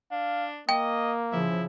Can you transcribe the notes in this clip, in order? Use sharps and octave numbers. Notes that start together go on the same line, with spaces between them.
D4 F5
A#3 D#5 G5
C#3 F3 E4